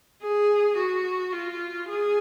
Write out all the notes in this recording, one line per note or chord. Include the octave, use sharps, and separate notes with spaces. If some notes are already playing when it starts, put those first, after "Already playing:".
G#4
F#4
F4
G#4